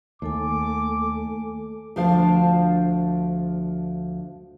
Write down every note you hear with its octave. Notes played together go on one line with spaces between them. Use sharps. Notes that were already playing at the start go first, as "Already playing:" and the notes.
D#2 A3 A4 G#5 D6
D2 F3 D4 C5 F5